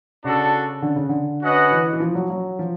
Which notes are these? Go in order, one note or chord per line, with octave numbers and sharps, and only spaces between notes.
C#3 D4 F#4 A4
D3
C#3
D3
C#4 F#4 B4 D#5 F#5
E3
E3
F3
F#3
F#3
F3